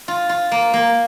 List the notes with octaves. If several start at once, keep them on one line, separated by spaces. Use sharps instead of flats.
F4
F4
A#3
A#3